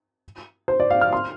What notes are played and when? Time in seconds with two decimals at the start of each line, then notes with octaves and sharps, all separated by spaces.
0.68 C5
0.80 D5
0.90 F5
1.01 F6
1.13 C6